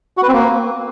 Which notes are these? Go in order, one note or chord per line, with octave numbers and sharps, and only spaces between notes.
F#4
B4
C4
A#3